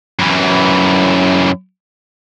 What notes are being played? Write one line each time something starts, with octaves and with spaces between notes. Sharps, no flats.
F#2 E3